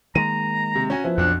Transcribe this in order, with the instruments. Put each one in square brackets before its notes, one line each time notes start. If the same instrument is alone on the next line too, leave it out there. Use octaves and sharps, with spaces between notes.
[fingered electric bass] D#3 G#3 A#3 [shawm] A#5 [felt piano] D#7
[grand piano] C3
C#4 F#4 G#5
[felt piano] F3 [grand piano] B3 E4
[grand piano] B1 D4 [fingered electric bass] F2 [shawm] F#5